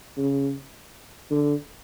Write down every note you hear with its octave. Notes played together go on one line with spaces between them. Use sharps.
C#3
D3